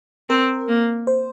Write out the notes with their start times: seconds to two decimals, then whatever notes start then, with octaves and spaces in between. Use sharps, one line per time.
0.30 C4 A#4
0.68 A#3
1.07 C5